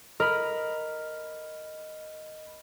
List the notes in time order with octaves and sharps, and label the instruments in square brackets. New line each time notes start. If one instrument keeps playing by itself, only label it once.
[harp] A#4 [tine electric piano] D#5 B5